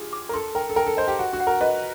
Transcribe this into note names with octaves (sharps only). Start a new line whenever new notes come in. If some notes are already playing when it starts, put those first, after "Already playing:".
Already playing: F4 G4 G#4
D6
A#4
A4 C6
A#4 G5
A4
A#4 G5
A4
C5 D#5
G4
F#4 F#5
F#4
F#5
A#4
B4 D#5